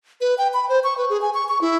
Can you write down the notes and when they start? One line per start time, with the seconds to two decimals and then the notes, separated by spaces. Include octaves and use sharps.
0.21 B4
0.38 G5
0.54 B5
0.69 C5
0.84 C#6
0.98 B4
1.10 G#4
1.22 G#5
1.34 C#6
1.49 C#6
1.61 E4